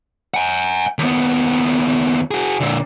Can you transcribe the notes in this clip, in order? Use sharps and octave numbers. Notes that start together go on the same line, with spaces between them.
F#5 G#5
D#2 B3
F#4 G#4
A#2 D3